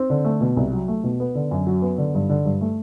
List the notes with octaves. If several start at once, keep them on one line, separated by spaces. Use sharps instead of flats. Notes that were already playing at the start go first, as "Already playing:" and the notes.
Already playing: C4
D3
A3
B2
C2
F#3
A3
B2
B3
D3
F#2
F#3
B3
D3
G2
D3
G2
A3